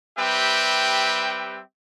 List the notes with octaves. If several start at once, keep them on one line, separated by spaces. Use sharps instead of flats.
G3 C4 G4 B4 E5 G5